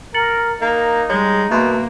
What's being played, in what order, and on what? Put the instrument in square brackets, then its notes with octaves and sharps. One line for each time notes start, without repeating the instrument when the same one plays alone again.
[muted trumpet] A#4 [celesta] A6 C#7 F#7
[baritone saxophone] A#3 [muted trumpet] D#4
[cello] G3 [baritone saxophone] G#3 [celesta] C#5
[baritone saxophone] B2 [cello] A#3 [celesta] E5 C6